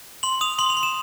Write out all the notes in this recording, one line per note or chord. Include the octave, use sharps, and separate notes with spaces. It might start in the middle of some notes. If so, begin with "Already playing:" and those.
C6 F#7
D#6 F7
C6 F#7
F7
C6
E7